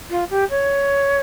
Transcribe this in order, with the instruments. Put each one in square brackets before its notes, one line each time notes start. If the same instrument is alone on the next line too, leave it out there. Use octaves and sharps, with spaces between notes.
[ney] F4
G4
C#5